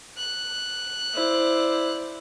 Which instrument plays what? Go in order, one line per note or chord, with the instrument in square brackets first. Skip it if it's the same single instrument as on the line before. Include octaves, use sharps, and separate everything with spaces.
[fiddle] F#6
[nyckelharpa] E4 [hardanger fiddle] C5 D5